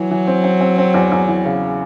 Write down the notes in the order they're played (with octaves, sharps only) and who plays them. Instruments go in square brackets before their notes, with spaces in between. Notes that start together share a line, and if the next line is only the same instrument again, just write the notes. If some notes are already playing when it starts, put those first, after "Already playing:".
Already playing: [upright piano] E3 [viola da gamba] F#3
[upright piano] E3
C4
C4
C4
C4
E2
E2
E3
C#3